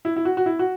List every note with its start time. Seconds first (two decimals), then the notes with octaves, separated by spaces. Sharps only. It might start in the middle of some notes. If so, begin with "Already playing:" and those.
0.05 E4
0.16 E4
0.25 F#4
0.37 F#4
0.46 E4
0.59 F#4